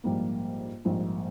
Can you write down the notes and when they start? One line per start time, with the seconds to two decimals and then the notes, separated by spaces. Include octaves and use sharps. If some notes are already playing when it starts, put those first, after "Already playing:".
0.04 A#1 G#2 G3 A#3
0.85 A#1 G#2 G3 A#3